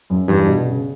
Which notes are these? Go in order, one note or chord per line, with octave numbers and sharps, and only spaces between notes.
F#2
E2 G2
B2
C#3